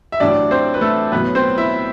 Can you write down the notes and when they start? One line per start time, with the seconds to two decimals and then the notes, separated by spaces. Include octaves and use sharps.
0.12 E5
0.20 A1 A2 F#3 D4 D5
0.51 C4 C5
0.74 B4
0.81 A3 A4
1.12 B1 A2 F#3 B3 B4
1.35 C4 C5
1.58 E4 E5